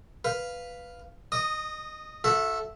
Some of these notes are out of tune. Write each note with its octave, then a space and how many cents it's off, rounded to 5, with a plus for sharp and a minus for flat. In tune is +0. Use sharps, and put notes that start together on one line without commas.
B4 +0 F5 +0
D#5 -20 D#6 +0
F#4 -40 A4 +0 E5 +0